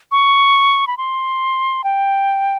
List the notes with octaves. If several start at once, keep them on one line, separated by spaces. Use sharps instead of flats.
C#6
B5
C6
G5